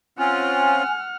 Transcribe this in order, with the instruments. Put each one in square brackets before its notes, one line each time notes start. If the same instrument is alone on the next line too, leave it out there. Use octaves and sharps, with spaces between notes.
[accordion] C4 C#4 F4 [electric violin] F#5 F6 [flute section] G#5